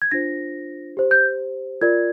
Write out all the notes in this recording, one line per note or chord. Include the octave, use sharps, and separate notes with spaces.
G#6
D4 F4 C5 A#6
G4 C5
G6
F4 A#4 D5 G#6